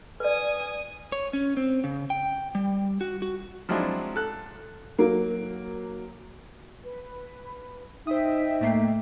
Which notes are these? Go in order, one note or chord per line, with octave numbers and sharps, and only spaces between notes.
B4 D5 G#5 D#6
C#5
C#4
C4
C#3
G5
G3
F#4
F#4
F3 F#3 G#3 C4 D4 E4
A4 F#6
F#3 A#3
B4
D#4 C5 D#5 E5 G5 D#6
A2 A3 A#3 C7